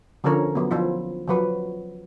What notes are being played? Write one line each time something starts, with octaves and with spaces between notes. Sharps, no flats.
D3 F3 C#4 A4 A#4 C#5
F#3 B3
F3 E4 F4
F3 F#3 B4